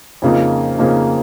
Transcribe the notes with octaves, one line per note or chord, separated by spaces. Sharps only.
F2 C#3 F3 A#3 D#4
F2 C#3 F3 A#3 D#4